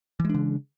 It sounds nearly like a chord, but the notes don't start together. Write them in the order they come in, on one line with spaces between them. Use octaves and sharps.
E3 G#3 D4 C#3